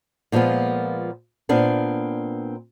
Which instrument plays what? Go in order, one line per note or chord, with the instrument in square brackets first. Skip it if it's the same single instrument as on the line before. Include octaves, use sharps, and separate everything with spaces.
[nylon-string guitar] A#2 F3 G#3 A#3 B3
A#2 B3 C4 D4